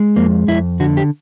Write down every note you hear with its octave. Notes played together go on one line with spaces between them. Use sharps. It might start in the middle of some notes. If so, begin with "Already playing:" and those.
Already playing: G#3
F2 A#3
F2 E4
D3 F#4
G4